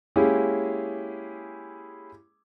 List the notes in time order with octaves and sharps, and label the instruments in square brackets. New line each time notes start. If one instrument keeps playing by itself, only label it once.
[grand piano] G#3 A#3 C#4 E4 G4 G#4